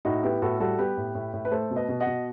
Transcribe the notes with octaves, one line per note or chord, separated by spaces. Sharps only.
A2 D#4 F#4
B3 E4 G4
A2 F#4 A4
G3 F#4 A4
B3 G4 B4
A2
A2
A2
B4
A3 A4 C5
B2
B4 D#5
B2
D#5 F#5
B2